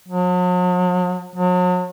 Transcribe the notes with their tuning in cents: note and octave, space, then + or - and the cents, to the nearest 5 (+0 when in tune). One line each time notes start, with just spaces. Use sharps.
F#3 -45
F#3 -40